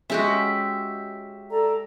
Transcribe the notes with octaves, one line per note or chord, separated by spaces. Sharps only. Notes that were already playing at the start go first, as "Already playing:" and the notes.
G#3 C#4 F#4 G4 E5
A4 D5 A#5